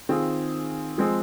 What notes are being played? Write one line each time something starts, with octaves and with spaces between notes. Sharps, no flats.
D#3 C4 F4 G#4
F3 G#3 C4 G#4